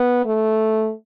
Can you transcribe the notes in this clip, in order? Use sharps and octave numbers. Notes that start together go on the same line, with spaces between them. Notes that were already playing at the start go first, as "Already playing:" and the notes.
Already playing: B3
A3